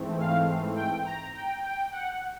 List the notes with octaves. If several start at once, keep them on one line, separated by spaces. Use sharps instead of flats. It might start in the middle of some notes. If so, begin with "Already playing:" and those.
Already playing: G#2 E3 A3 C4
F5
G5
A#5
G5
G5
F#5